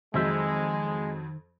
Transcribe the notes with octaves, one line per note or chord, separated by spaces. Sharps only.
F2 D#3 F#3 G#3 C5 E5